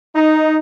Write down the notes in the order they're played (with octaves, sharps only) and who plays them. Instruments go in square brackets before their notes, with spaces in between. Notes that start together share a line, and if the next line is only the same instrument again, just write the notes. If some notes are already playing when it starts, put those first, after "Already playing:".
[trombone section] D#4